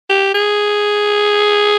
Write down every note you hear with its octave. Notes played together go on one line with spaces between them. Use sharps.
G4
G#4